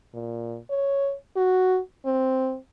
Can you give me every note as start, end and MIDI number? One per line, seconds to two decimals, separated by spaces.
0.14 0.58 46
0.70 1.14 73
1.37 1.79 66
2.06 2.57 60